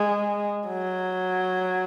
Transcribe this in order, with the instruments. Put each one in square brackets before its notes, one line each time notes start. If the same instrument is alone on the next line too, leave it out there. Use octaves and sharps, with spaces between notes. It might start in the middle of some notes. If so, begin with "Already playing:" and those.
Already playing: [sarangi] G#3
F#3